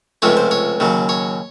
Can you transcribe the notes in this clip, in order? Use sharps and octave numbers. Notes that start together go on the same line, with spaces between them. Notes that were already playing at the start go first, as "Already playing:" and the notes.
C#2 C3 F3 A3 C#5
C5
C#5
D#2 C#3 F#3
C#5